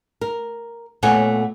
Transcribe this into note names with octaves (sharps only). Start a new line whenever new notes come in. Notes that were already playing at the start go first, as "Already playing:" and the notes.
A#4
A#2 A3 B3 C#5 F#5 G#5